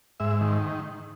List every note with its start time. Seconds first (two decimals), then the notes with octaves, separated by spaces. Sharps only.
0.20 G#2 E5
0.41 D#3